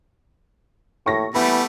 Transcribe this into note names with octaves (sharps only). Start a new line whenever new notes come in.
A2 C#6 A#6
E3 G3 A3 B3 B5